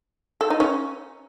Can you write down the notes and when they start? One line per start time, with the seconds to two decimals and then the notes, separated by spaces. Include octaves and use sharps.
0.41 A4
0.50 D#4
0.60 C#4